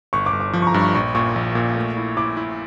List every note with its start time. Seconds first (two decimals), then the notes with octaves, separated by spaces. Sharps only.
0.13 G1 C#6
0.26 D6
0.33 G1
0.40 D6
0.53 F3
0.62 C#6
0.67 A#5
0.74 G2
0.81 C#6
0.95 A#1 C#6
1.15 A#2 C#6
1.36 A#1
1.55 A#2
1.75 A3
1.97 E4
2.17 E4 D6
2.37 E4